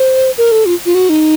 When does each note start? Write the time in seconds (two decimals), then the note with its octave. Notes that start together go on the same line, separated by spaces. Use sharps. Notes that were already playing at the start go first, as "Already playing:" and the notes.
Already playing: C5
0.38 A#4
0.52 A4
0.66 F4
0.86 F4
0.95 F#4
1.09 D#4